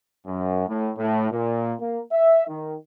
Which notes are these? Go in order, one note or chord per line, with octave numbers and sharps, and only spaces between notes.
F#2
A2
A2
A#2
A#3
E5
D#3